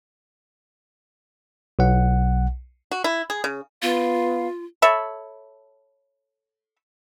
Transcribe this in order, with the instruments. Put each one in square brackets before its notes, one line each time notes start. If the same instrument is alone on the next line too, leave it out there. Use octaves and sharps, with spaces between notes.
[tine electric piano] B1 F#5
[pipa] F#4
E4
G#4
C#3
[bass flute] B3 [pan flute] F4 [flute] F5
[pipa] A4 C#5 E5 B5